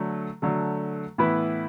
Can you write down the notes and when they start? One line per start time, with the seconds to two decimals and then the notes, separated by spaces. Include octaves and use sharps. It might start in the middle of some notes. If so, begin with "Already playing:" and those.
Already playing: D3 F#3 A3
0.42 D3 F#3 A3
1.18 A2 E3 B3 E4 B4